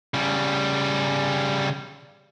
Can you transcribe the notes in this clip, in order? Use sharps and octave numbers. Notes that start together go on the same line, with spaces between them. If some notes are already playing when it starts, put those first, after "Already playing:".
C#3 G3